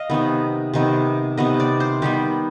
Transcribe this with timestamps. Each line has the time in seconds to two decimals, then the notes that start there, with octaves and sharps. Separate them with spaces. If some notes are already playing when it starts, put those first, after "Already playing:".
Already playing: D#5 F5
0.10 C3 D#3 B3
0.74 C3 D#3 B3
1.37 C3 D#3 B3 D#5
1.60 D5
1.80 C5
2.02 D#3 G3 B3 G4